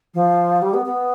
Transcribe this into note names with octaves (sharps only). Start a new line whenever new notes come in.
F3
G3
B3
B3